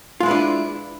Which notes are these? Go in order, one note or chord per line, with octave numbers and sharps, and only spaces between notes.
G#3 D4 E4 F4 B4